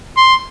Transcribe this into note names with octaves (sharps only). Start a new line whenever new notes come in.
C6